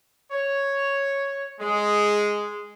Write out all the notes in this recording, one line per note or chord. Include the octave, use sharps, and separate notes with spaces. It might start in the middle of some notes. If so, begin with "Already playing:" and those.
C#5
G#3